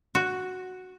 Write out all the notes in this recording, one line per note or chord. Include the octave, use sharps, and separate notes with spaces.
F#4